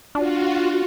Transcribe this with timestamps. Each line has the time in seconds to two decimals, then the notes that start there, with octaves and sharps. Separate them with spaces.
0.15 D4 F4 F#4